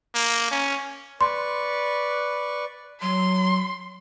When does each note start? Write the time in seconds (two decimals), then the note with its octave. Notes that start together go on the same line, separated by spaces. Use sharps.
0.15 A#3
0.51 C#4
1.21 B4 D5 C6 C#6
3.02 F#3 C6